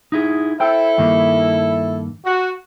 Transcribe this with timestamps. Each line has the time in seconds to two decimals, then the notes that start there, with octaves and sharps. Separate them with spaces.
0.12 D#4 E4 G#4
0.60 E4 A4 C5 G5
0.98 G2 D#3 A#3
2.25 F#4